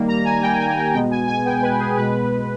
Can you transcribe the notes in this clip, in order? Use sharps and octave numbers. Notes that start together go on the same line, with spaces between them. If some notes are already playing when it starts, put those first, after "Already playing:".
Already playing: D#3 G3 A#3
A#5
G#5
D#3 G3 A#3 G5
G#5
G5
B2 G#3 B3 G5
G#5
G#5
B2 G#3 B3 G5
B4
G#4
B2 G#3 B3 B4